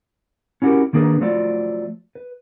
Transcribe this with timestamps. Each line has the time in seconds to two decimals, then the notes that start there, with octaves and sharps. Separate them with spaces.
0.62 C#4 E4 F#4 G4 A#4
0.93 D#3 A#3 D4 G#4 A4 B4
1.21 F3 F#3 A3 F4 D5
2.15 B4